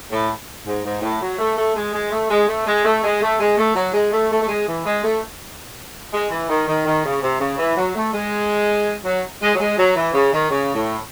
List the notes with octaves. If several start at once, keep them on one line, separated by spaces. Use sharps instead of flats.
A2
G#2
G#2
A2
F#3
A3
A3
G#3
G#3
A3
G#3
A3
G#3
A3
G#3
A3
G#3
A3
F#3
G#3
A3
A3
A3
G#3
E3
G#3
A3
G#3
E3
D#3
D#3
D#3
C#3
C3
C#3
E3
F#3
A3
G#3
F#3
G#3
F#3
G#3
F#3
E3
C#3
D#3
C#3
A2